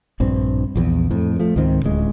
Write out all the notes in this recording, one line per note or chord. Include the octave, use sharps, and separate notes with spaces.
A#1 G2 C4
A#1 E2
F2 A2
F3 A3
C#2 G#2 D#3 C4
D1 C#2 G#3